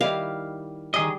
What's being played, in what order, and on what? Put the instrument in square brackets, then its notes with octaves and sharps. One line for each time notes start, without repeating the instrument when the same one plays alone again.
[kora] D#3 G3 E4 [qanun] F5
[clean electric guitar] D#3 G#4 D#5 [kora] G3